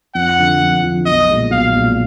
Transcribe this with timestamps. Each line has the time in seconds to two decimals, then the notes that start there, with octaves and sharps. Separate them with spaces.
0.15 F2 F#5
0.38 D3 F3
0.61 F2
0.83 D3 F3
1.05 B1 D#5
1.29 A#2 G#3
1.51 B1 F5
1.74 A#2 G#3